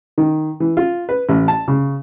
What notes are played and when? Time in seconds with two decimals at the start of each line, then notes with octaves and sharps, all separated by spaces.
0.18 D#3
0.60 E3
0.77 F4
1.09 B4
1.29 A1
1.48 A5
1.68 C#3